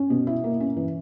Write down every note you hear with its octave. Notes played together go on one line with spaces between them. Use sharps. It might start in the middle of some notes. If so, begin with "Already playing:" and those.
Already playing: C#4
B2
E4
A#3
C#4
E3